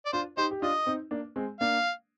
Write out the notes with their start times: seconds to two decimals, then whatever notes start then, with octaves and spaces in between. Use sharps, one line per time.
0.06 D5
0.13 D4 F4 C5
0.37 D#4 G4 C5
0.51 G4
0.62 D4 F4 D#5
0.86 C4 D#4
1.11 A#3 D4
1.36 G#3 C4
1.60 A#3 D4 F5